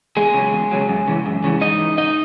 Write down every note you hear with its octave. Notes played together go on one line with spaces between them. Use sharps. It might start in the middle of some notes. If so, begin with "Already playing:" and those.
E2 G#3 G#4
C#3 F#3
E2
C#3 F#3
F#2
C#3 E3
F#2
C#3 E3
G#2 D#4 D#5
E3
G#2 D#4 D#5